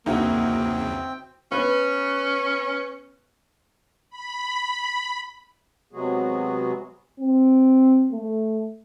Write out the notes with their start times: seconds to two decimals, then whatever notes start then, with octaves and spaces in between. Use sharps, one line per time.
0.06 E2 C#3 A#3 C4 D#4 E4 F#4 G5
1.52 B3 C#4 B4
4.10 B5
5.93 C3 F#3 G#3 B3 F#4 G#4
7.20 C4
8.12 A3